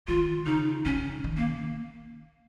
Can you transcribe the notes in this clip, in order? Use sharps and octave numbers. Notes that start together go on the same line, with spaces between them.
D#3 F4
C#3 D#4
C#3 C#4
D#3
A#3